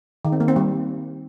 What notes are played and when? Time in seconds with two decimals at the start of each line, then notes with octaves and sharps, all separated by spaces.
0.25 D#3
0.32 C4
0.40 A#3
0.48 C4
0.56 G3